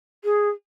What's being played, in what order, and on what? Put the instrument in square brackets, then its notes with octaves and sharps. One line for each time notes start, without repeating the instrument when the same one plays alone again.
[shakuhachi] G#4